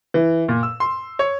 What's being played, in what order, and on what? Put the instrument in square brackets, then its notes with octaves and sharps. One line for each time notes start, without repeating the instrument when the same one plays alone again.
[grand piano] E3
A#2
E6
C6
C#5